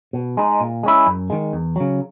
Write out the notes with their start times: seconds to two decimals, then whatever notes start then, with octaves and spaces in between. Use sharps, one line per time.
0.13 B2
0.37 G#3 D#4
0.60 A#2
0.83 G#3 C#4 E4
1.07 F#2
1.30 D#3 G#3
1.53 E2
1.76 C#3 F#3